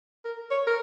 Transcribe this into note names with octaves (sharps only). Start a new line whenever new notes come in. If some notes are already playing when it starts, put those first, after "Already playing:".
A#4
C#5
A#4